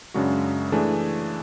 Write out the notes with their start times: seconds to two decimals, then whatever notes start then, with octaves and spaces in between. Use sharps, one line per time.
0.14 F#2 C#3 G#3 D4 F#4
0.72 E3 A3 D4 G#4